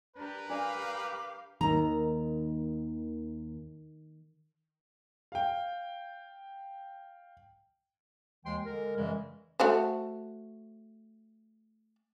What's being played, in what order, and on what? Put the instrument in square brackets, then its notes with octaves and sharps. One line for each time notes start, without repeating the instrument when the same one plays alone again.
[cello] D4 G4 [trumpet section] A#4 B4
[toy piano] D4 D5 [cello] G4 F5 [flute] D6
[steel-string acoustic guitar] D#2 A#5 [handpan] D#3
[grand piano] F5 G5
[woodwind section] D#2 E3 G#3 G5 C6
D3 G#3 A#4
F#2 C#3 E3 G3 G#3
[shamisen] A3 F#4 C5